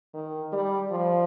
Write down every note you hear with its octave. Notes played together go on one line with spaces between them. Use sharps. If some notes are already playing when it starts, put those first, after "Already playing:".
D#3
G3
F3